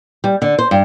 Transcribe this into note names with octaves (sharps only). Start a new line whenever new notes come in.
G3
D3
C5
G2